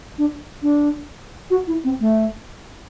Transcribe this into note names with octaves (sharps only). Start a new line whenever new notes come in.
D4
D4
F#4
E4
C4
A3